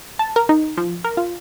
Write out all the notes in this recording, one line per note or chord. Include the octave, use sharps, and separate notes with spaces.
A5
A#4
D#4
F3
A#4
F4